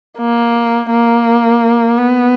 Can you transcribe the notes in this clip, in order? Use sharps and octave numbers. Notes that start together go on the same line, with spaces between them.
A#3
A#3
B3